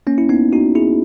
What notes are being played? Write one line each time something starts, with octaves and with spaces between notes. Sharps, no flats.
A#3 C#4
E4
B3 D#4
D#4 F#4
E4 G#4